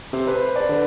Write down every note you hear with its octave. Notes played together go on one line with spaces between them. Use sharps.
C3 C5
B4
C5
D5
D3 B4